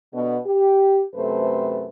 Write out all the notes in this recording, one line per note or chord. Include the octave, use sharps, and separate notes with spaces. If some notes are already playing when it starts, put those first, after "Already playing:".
B2 D3 B3
G4
F#2 C3 A3 A4 B4 C5